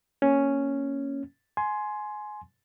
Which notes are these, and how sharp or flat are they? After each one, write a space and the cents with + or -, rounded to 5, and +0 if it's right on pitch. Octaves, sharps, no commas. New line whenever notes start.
A#3 +0 C#4 +0
G#5 +20 C6 +0